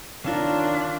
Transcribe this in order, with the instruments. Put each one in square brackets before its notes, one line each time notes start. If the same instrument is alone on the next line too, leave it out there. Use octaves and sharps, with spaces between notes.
[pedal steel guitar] D#3 C#4 A#4 [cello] D4 [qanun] F4 E5 F5